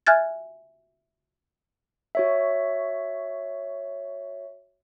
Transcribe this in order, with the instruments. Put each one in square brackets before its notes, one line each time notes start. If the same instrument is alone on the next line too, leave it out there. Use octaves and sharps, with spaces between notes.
[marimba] E5 G#5 F6 F#6 G#6 A6
[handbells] F#4 C#5 E5